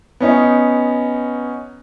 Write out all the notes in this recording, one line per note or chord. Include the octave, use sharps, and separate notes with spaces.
B3 C#4 D#4